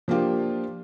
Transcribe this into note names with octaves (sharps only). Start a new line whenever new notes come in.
F3 A#3 D4 F4 G4